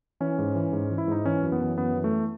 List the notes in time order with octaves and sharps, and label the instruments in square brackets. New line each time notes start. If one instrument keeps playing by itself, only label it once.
[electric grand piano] E3 C#4
G#2
E3
G#2
E3
E4
G#2 D#4
E3 C#4
F#2
B3
E3
F#2 B3
E3
A3